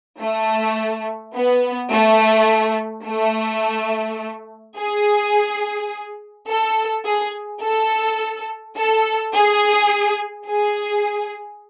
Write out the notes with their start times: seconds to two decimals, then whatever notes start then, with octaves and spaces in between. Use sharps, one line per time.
0.21 A3
1.35 B3
1.91 A3
3.06 A3
4.77 G#4
6.48 A4
7.05 G#4
7.63 A4
8.76 A4
9.34 G#4
10.47 G#4